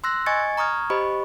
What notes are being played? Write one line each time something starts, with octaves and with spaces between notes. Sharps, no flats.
C6 E6 F#6 A#6
D#5 G#5 C#6 G#6 A6 C#7
A#5 C#6 D#6 F6 G#6
G4 C5 D#5 B5 C#6